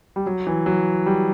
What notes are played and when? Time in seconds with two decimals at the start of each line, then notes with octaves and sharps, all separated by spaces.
0.16 G3
0.26 F#3
0.47 E3
0.66 F#3
1.06 G3